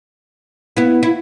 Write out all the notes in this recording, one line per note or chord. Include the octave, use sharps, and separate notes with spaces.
B3 E4
E4